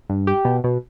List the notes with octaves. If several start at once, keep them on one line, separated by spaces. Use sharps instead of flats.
G2
G4
B2
B2